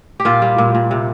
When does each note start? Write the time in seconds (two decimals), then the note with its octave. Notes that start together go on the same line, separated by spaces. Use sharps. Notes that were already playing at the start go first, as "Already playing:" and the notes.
0.20 G4
0.25 A#2 F4
0.42 G3
0.58 A#2
0.75 A#2
0.91 C3